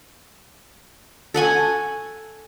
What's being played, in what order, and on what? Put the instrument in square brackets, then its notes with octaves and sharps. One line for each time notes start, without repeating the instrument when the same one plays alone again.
[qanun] A4 F#5 G#5 C#6